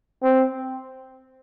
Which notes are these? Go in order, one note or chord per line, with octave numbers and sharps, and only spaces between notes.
C4